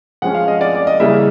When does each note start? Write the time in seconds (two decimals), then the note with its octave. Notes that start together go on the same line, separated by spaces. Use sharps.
0.22 F3 G#3 C#4 F#5
0.34 F5
0.48 D#5
0.61 D5
0.75 D5
0.87 D#5
1.00 C#3 E3 G3 A#3 E5